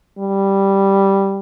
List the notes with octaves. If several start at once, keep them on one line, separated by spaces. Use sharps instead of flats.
G3